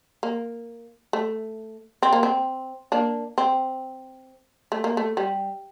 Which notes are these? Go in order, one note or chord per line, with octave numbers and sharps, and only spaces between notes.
A#3
A3
C4
A#3
C4
A#3 D4
C4
A3
A#3
A3
G3